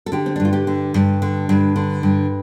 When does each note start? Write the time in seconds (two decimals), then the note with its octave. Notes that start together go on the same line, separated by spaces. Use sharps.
0.06 A4
0.12 D3 G4
0.26 C4
0.36 D4
0.40 G2
0.45 F4
0.53 G4
0.67 D3
0.94 G2
1.22 D3
1.49 G2
1.76 D3
2.03 G2